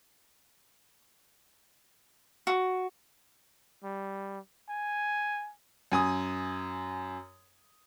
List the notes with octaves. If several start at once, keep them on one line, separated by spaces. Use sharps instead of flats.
F#4
G3
G#5
F#2 G#5 D#6